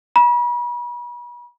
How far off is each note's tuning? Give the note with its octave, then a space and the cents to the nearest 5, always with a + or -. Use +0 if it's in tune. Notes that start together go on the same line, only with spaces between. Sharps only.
B5 -40